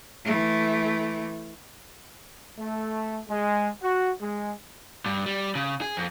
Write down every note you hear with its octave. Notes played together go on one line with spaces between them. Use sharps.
E3 A3
A3
G#3
F#4
G#3
G2
G3
C#3
G#4
F2